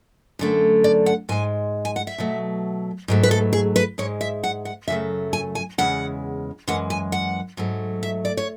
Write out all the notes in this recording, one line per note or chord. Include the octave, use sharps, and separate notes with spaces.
F#2 D3 A3
D5
F#5
G#2 G#3 G#5
G#5
F#5
E5
B2 F#3 A3
G#2 F#3 A3
B4
A4
G#4
B4
G#2 G#3 C#5
E5
F#5
F#5
F#2 C#3 F#3 A3 E5
G#5
G#5
E2 C#3 G#3 F#5
F#2 E3 G#3 F#5
G#5
F#5
G#2 F#3 A3
E5
D5
C#5